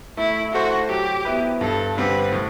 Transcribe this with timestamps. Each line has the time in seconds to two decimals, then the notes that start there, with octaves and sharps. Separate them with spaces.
0.17 A3 E4
0.53 E4 F#4 A4 C5
0.89 F#3 G4
1.25 B3 E4 B4
1.61 G2 A4
1.97 D3 G3 C4 G4 B4
2.33 A2